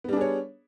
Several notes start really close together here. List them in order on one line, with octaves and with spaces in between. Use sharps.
B3 G3 D4 G#4 C#5